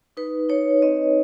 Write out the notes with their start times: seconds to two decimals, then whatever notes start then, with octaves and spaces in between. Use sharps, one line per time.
0.17 D#4 B4
0.49 D#4 C#5
0.82 C4 D#5